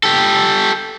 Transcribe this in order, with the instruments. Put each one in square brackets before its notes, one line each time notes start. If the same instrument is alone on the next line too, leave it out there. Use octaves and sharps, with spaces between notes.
[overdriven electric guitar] G4 A4